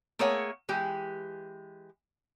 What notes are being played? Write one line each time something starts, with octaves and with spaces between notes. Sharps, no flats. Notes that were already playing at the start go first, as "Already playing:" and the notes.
A3 A#3 G#4 A#4 C#5 F#5
E3 G#3 G4